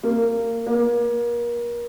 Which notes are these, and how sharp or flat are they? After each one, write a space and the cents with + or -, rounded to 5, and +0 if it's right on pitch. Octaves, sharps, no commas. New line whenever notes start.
A#3 -15
A#3 +35